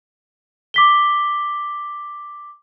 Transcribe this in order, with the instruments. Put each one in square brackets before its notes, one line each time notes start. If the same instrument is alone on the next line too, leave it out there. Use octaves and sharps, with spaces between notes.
[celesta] D6 B6 G7